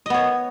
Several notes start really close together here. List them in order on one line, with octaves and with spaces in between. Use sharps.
D#5 B3 C#5